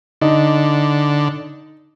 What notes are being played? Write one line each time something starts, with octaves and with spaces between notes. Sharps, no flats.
D3 D#4